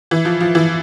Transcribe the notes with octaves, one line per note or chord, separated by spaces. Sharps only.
E3
F3
F3
E3